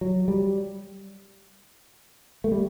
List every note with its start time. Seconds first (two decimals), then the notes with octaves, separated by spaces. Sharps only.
0.01 F#3
0.28 G3
2.44 A3
2.51 G3